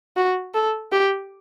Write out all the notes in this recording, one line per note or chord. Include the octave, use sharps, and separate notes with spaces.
F#4
A4
G4